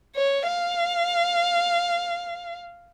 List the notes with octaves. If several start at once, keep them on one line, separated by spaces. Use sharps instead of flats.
C#5
F5